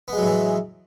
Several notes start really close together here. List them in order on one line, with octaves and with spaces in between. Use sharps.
B3 G#3 F#3 A2 E3